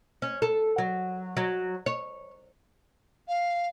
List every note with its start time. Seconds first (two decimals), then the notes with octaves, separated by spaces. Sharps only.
0.22 C#4
0.42 A4
0.78 F#3
1.37 F#3
1.86 C#5
3.28 F5